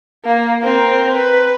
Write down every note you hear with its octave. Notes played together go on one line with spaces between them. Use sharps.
A#3
C4 A#4
B4